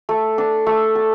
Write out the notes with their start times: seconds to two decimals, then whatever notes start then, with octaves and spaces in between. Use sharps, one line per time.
0.09 A3
0.38 D4
0.67 A3
0.95 A4